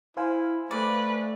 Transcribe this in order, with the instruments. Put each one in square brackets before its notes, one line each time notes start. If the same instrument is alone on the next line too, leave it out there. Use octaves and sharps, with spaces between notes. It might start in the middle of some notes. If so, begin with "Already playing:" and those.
[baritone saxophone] E4 [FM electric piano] C5 F5 G#5
[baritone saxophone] A3 [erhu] B4 [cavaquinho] D5